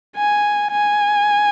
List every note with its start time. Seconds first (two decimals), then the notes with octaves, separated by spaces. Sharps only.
0.17 G#5
0.72 G#5